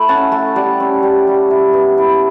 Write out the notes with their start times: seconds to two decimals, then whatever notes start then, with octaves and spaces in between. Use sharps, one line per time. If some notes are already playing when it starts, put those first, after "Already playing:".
Already playing: A3 E4 B5
0.09 C#4 F#5 A5
0.32 A3
0.55 G3 D5 F#5
0.80 C#4
1.03 G3
1.27 G3
1.51 E4
1.73 B3
1.98 E4